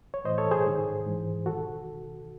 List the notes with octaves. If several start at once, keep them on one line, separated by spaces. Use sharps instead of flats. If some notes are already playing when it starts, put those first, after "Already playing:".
C#5
A2 E3 C5 D#5
A4 C#5
G#4 C5
G#2 D#3
G#2 E3
D#3 F#4 A4